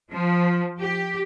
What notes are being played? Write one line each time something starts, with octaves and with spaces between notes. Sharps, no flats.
F3
G4